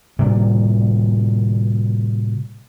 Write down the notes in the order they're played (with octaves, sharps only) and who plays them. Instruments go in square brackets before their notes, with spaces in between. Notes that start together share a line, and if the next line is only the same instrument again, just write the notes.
[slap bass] A2 C3 G3 A#3